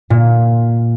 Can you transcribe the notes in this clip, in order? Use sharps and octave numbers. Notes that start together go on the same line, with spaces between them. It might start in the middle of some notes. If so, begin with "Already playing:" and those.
A#2